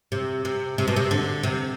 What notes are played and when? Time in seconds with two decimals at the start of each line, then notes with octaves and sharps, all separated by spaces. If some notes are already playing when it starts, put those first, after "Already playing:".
0.12 C3
0.45 C3
0.78 C3
0.88 B2
0.96 C3
1.11 D3
1.43 C3